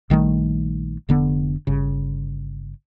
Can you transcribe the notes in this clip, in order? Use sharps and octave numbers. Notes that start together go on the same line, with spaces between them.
A#1 D#3 G3 A3
F1 D3 B3
G1 C#3